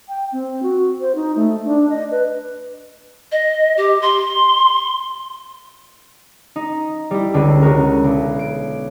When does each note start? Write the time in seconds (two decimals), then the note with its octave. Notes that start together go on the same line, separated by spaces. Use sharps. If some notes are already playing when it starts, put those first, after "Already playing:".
0.09 G5
0.32 C4
0.63 F#4
1.01 C5
1.16 D#4
1.36 A3
1.65 D4
1.90 D#5
2.11 B4
3.32 D#5
3.77 G4
4.02 C6
6.56 D#4
7.11 G3 E4
7.34 C#2 D3
7.62 C#3 G#3 C#4 F#4 A#4
8.04 B1
8.39 D7